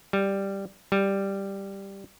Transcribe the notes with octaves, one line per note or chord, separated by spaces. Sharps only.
G3
G3